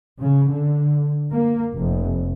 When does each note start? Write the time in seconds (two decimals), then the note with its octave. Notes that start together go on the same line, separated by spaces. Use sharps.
0.21 C#3
0.53 D3
1.32 A#3
1.75 F1